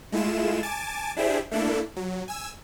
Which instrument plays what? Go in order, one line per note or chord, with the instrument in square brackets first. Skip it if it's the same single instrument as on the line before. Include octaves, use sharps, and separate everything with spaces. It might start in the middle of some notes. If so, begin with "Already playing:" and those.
[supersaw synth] G#3 A3 E4 F4 E7
G#5 A5 D6 A6
D4 E4 G4 G#4 C5 E5
A3 A#3 D4 E4 A4
F#3
G#5 E6